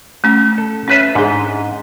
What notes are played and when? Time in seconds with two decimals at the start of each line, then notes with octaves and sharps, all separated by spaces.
0.24 A3 C#4
0.58 A4
0.88 C#4 F4 B4 C#5 E5
1.15 G#2 D4 G#4